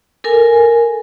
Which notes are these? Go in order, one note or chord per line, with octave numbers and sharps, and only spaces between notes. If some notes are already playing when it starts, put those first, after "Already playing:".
A4 A#4 G#5